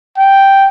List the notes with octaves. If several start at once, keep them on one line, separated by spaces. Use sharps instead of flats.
G5